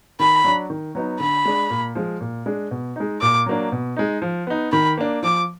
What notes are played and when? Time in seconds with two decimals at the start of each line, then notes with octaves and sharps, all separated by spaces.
0.19 D#3 B5
0.44 F#3 D4
0.70 D#3
0.95 F#3 B3 D#4
1.20 D3 B5
1.45 G#3 D4
1.70 A#2
1.95 F3 G#3
2.21 A#2
2.46 G#3 D4
2.71 B2
2.96 G#3 D#4
3.21 A#2 D6
3.46 F#3 A#3 D4
3.72 B2
3.97 G#3 D#4
4.22 F3
4.47 B3 D#4
4.72 D#3 B5
4.98 A#3 D4
5.23 F3 D6